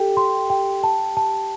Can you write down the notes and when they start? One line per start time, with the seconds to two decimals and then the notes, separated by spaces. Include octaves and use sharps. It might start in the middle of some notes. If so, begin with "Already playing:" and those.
Already playing: G4 A4 G5
0.17 C6
0.50 G5
0.83 A5
1.17 A5